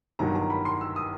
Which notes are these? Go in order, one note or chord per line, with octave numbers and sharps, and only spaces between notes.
G1 G2 D#3 F#3 A#5
A#5
B5
C6
E6
D#6